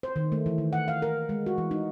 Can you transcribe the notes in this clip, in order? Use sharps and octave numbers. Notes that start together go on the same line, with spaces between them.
C5
D#3
A3
E3
D#3
F#5
F5
A#4
G#3
F#4
E3
D#4